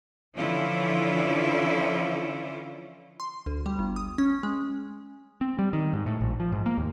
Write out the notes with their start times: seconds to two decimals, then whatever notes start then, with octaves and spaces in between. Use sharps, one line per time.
0.37 D3 E3 F3 C#4 E4 F4
3.20 C6
3.46 D2
3.66 G3
3.79 G1
3.96 D#6
4.18 C#4
4.43 G#3
5.41 C4
5.59 G3
5.73 D#3
5.93 G#2
6.06 A2
6.21 A#1
6.40 F3
6.52 G#2
6.66 A#3
6.78 D#2